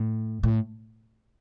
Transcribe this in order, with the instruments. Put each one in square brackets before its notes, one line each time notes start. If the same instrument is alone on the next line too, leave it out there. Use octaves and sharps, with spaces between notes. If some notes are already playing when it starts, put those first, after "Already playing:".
Already playing: [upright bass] A2
A2